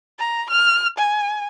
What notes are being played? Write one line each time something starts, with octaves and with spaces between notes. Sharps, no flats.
A#5
F6
G#5